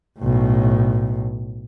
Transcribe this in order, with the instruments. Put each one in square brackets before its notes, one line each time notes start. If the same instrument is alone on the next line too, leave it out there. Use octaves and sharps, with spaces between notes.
[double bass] B1 A2